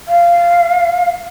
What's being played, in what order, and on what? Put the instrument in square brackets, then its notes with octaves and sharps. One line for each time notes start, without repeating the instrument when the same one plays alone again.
[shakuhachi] F5